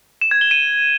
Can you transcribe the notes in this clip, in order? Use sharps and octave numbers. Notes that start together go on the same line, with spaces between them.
E7
G#6
G7
D#7